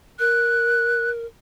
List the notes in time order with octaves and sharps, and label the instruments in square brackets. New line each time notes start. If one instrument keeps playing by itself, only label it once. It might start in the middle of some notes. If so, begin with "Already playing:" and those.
[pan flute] A#4 [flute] F#6